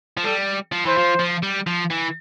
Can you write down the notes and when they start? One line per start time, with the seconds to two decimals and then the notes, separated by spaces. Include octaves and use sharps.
0.17 F3
0.24 G3 A4
0.72 F3
0.85 E3 C5
0.97 F3
1.19 F3
1.43 G3
1.67 F3
1.91 E3